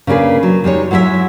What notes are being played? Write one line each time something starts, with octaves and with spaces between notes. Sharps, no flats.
C#3 A#3 D4 G#4 B4
F#3
G3 G#3 D#4 C#5
F#3 G#3 E4 C5 E5